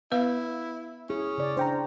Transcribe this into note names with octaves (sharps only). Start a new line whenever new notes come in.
B3 E4 B4 F5
C#4 E4 G#4
C#3 D5
D4 C5 G5 A#5